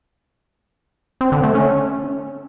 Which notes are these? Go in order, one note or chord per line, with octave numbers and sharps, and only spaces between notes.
C4
D3
A3
C#4